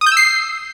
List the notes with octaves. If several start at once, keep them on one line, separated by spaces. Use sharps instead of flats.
D#6
G6
E6
C7